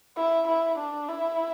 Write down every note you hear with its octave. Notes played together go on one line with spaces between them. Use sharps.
E4
E4
D4
E4